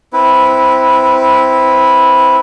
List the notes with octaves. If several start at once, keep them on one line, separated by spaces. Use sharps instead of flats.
C4 E4 B4